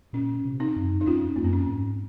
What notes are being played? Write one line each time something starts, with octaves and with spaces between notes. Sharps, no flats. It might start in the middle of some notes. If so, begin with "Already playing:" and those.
A#2 C#4
C3
C4 D#4
F#2
D#4
F2 C#4 F4
F#2 A#3
C4
C#4
G#2